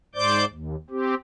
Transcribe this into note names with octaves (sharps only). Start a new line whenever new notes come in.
G#2 C5 D5 D6 G6
D#2
C4 G4